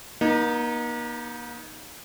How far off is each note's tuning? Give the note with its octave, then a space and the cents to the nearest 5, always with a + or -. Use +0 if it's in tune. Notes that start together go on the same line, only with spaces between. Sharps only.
A#3 +45 D#4 +0